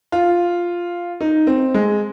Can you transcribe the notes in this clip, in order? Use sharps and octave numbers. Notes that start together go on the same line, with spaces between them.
F4
D#4
C4
G#3